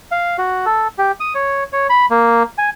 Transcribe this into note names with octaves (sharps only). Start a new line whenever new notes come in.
F5
F#4
A4
G4
D#6
C#5
C#5
B5
A#3
G#5